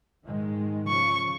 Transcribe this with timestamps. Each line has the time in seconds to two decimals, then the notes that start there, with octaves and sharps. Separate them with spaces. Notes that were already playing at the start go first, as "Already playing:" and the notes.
0.25 G#2 D#3 G#3
0.88 C#3 F3 C#6